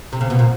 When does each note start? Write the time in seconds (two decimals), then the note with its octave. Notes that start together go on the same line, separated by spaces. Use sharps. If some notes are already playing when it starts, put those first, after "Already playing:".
0.13 C3
0.21 C#3
0.30 B2
0.39 A#2